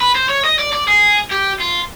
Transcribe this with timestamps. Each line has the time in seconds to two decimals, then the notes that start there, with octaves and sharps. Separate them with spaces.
0.01 B4
0.15 C5
0.29 C#5
0.44 D#5
0.59 D5
0.73 D5
0.88 G#4
1.32 G4
1.60 F4